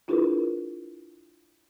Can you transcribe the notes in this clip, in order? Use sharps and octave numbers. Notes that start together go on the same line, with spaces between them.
D4 E4 F4 G#4 A#4 B4